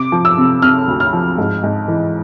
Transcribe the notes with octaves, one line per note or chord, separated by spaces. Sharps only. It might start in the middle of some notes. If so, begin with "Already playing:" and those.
Already playing: C3 D6
F3
E6
C3
C3 F6
D2
F6
F3
G#2
G#2
E3